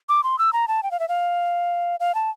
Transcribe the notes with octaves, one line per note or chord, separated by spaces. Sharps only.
D6
C6
E6
A#5
A5
G5
F5
E5
F5
F5
A5